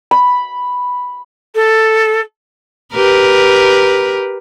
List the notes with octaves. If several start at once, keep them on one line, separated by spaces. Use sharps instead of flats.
B5
A4
G4 A#4 B4